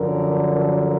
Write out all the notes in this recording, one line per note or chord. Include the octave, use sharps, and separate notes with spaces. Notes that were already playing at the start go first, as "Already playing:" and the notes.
Already playing: F#2 D3 F3 A#4
A#4